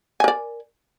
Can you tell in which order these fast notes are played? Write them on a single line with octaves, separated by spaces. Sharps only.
G#5 A#4 D5